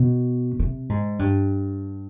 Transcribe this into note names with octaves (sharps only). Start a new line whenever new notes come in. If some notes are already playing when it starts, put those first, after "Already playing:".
Already playing: B2
C3
G#2
G2